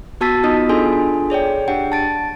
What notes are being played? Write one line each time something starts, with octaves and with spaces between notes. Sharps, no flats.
B3 F#4 A5 E6 A6 B6
B3 D#4 F4 D#5 D#6
D4 F4 G#4 A4 G#5 C6
G#4 C#5 D5 G5
D4 G4 F#5 G5
A5 A6 D7